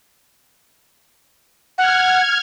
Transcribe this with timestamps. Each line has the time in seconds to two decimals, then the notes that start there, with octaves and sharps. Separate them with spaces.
1.78 F#5 F6 G#6